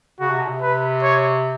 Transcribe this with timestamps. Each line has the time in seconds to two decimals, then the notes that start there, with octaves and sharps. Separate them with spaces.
0.20 C#3 F#4
0.30 C3
0.40 B2
0.48 C3
0.62 B4
1.03 C#5